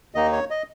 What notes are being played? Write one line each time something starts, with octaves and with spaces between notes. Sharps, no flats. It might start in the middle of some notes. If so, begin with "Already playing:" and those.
D#2 D#3 A#3 D#4 D#5
C#5
D#5